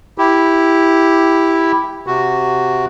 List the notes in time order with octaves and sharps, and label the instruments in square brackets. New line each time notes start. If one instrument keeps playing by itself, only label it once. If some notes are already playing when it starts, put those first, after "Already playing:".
[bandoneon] E4 G4
C3 F#4